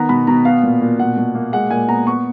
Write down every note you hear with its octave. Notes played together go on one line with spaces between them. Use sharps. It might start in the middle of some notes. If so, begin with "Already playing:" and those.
Already playing: D#3 B3 A#5
B2 B5
B2 A#5
B3 F5
A#2
A#2
B2 F#5
B2
A#3
G#3 F#5
A#2 G#5
B3 A#5
B3 C#6